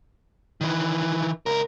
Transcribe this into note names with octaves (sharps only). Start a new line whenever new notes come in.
D#3 E3
C#2 A#4